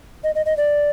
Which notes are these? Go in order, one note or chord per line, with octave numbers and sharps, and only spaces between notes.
D#5
D#5
D#5
D5